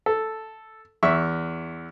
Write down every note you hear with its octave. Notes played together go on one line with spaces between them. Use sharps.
A4
E2 E5 C#6